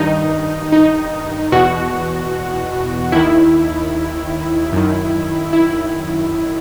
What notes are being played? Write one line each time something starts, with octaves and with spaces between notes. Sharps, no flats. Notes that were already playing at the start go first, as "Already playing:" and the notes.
Already playing: G2 D#3 D#4
D#4
E2 B2 F#4
D#2 D#3 E4
F#2 D#3
E4